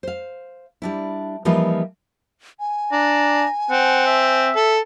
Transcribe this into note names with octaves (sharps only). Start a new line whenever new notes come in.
C5 F5
G3 D4 E4
E3 F3 G3 A#3 D#4 F4
G#5
D4 A#5
C4 F#5
E5
A4